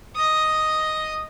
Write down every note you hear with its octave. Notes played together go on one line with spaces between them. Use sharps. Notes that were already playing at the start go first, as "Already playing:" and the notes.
D#5 D#6